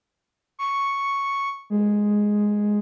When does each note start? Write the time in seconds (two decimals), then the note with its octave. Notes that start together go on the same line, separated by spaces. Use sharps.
0.59 C#6
1.70 G#3